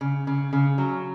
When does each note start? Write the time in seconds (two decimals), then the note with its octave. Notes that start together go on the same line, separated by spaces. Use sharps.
0.01 C#3
0.27 C#3
0.53 C#3
0.78 F#3